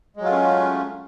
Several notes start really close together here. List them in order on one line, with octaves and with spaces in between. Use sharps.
G#3 F#3 F4 A3 C#4